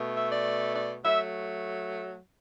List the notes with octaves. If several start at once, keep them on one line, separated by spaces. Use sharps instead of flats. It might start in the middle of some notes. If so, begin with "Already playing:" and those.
Already playing: B2 A3
E5
D5
D5
F#3 A3 E5